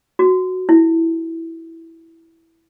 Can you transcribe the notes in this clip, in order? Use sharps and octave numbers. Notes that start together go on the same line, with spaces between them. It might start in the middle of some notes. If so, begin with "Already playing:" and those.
F#4
E4